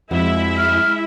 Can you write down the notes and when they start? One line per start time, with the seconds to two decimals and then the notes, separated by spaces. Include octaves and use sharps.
0.11 F2 G#3 E4 F#4 E5
0.58 F6